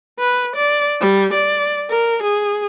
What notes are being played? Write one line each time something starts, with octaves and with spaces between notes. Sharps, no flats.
B4
D5
G3
D5
A#4
G#4